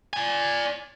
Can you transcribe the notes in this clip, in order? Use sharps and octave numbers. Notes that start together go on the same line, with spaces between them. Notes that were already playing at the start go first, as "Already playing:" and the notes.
D5 G#5